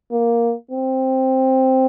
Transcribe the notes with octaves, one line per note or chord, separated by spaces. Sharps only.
A#3
C4